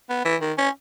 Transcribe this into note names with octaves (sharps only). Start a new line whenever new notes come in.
B3
E3
D#3
C#4